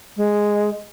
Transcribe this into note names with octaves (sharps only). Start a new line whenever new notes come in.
G#3